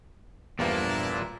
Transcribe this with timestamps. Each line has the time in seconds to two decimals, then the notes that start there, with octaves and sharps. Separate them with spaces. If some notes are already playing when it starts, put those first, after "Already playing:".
0.59 E2 G2 A#2 F3 D4 E4